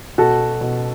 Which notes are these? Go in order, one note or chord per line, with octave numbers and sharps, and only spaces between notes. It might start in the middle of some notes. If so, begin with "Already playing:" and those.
B2 F#4 A4
B2